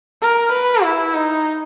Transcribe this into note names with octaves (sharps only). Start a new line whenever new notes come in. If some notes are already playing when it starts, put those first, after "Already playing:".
A#4
B4
E4
D#4